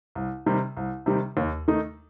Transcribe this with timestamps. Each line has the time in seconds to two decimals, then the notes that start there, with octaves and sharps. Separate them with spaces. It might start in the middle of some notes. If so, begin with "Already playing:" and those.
0.15 C2
0.46 C3 D#3 G3
0.77 C2
1.06 C3 D#3 G3
1.37 D#2
1.68 D#3 A3 D#4